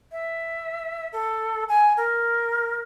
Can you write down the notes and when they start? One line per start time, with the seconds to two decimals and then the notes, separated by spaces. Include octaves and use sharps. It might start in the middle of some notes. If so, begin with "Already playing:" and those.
0.12 E5
1.12 A4
1.69 G#5
1.97 A#4